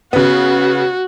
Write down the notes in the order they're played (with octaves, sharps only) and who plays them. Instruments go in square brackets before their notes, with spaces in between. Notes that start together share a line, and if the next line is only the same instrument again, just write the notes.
[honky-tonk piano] C#3 B3 [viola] F#4